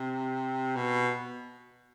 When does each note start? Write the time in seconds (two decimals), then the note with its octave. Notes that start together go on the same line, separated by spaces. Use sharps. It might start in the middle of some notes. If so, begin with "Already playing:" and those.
Already playing: C3
0.76 B2